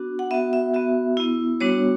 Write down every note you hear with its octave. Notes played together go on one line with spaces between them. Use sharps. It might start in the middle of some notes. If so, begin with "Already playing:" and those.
Already playing: B3 D4 F#4
F#5
B3 F#4 E5
E5
B3 F#4 E5
B3 E4
G3 B3 D4 F#4 C#5